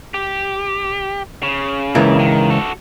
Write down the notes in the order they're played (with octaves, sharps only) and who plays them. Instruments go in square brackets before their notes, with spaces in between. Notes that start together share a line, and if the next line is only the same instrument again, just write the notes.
[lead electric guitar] G4
C#3
[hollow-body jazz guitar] C#2 E3 A#3
[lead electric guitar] D#3
F#4 A4